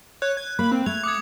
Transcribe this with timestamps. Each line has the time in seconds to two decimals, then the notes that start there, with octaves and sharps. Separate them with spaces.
0.22 C#5 F#6
0.37 G#6
0.59 A#3 B5
0.72 C4
0.86 A3 G#6 F7
1.04 D6 D#6 G#6 C#7